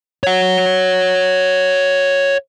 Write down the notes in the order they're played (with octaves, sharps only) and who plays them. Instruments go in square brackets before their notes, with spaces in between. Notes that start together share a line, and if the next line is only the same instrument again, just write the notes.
[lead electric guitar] C#5 F#5